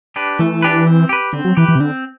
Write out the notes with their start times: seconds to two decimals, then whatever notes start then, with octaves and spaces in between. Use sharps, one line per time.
0.16 D4 G4 B4
0.39 E3 A3
0.62 D4 G4 B4
0.87 C4
1.09 G4 B4
1.33 D3 C4
1.45 F#3
1.57 E3 G4 B4
1.68 E3
1.75 C3
1.80 D3 C4